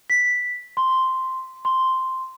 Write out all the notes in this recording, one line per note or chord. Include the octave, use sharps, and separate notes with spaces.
B6
C6
C6